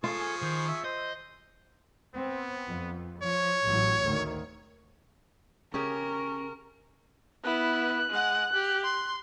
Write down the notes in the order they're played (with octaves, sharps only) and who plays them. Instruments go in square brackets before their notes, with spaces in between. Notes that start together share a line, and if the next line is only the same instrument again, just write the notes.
[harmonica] F3 G#4 C#6 [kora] F4 [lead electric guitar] A4
[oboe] G#5
[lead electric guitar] D#3 [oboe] C5
[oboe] E5
[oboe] C5 [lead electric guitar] D#5
[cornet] B3 [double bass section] C4
[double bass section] F2
[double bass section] F3 [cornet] C#5
[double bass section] A1 A2 F#3
G#1 D2 D#3
[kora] C#3 G4 G#4 [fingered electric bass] C#4 [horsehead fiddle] A#4 [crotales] C#6
[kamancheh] B3 E4 [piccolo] F#6
[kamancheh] G#3 F#5
G4
C6